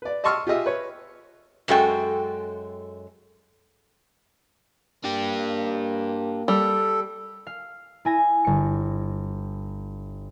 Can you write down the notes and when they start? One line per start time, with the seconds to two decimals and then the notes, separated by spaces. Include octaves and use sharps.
0.02 B4 D5
0.24 D#5 A5 C6 C#6 E6 F6
0.47 F4 G4 G#4 D#5 E5
0.66 B4 C#5
1.68 F#2 G#3 F#4 A4 G5
5.04 A#3 D4 G4
6.48 G3 A4
7.47 F5
8.05 E4 G#5 A#6
8.45 G1 C#7